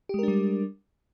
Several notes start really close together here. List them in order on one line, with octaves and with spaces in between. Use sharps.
G4 G#3 A#4 D4 G3